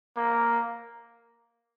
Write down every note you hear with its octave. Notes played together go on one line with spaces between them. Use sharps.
A#3